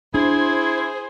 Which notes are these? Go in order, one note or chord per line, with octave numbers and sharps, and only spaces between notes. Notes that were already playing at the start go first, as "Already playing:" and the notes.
D4 E4 G#4 C5